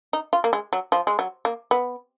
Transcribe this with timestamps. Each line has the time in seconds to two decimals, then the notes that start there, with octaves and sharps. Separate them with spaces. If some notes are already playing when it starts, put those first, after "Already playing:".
0.13 D#4
0.33 F4
0.44 A#3
0.53 G#3
0.73 F#3
0.92 F3
1.07 G#3
1.19 F#3
1.45 A#3
1.71 B3